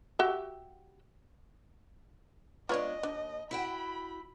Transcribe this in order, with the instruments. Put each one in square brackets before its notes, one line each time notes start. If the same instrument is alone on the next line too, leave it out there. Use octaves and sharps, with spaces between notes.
[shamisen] F#4 G4 E5
[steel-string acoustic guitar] G#3 B3 D4 [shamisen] F4 B4 C#5 [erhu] D#5
[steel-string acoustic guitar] D#2 [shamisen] D4
[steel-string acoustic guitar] E4 F#4 G5 [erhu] B5